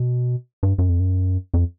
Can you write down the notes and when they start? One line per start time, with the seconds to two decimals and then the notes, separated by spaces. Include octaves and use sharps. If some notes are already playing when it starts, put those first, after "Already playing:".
Already playing: B2
0.63 G2
0.78 F#2
0.89 F2
1.00 F#2
1.54 F2